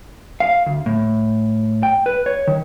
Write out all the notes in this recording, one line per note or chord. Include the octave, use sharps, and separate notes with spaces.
F5
D2
A2
G5
B4
C#5
D#3